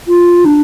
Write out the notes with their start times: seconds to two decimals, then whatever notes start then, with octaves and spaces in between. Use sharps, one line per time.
0.08 F4
0.45 D4